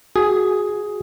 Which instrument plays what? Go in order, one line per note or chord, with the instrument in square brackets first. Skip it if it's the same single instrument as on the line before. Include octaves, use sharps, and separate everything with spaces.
[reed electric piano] F#4 [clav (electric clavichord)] G#4